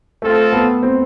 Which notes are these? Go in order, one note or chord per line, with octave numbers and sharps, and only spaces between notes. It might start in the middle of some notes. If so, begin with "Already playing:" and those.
A3 C4 F4 A4
B3
C4